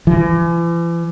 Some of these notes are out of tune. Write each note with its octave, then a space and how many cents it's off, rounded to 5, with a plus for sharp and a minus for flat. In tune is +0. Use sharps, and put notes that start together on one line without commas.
E3 +40